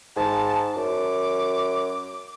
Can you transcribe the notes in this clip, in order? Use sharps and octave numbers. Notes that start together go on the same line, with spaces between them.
G#2 A5
F#2 D6